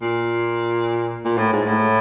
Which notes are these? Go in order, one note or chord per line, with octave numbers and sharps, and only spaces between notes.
A#2
A#2
A2
G#2
A2